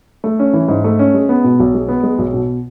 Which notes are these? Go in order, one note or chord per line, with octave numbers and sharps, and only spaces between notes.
A3
C#4
E3
G#2
A3
C#4
G#3
B3
B2
B1
G#3
B3
G#3
B1
B2